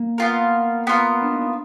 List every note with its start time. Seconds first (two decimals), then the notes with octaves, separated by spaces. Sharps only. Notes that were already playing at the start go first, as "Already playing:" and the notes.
Already playing: A#3
0.18 B3 F4 A#4
0.87 B3 F4 A#4
1.22 D4
1.31 D#4
1.41 D4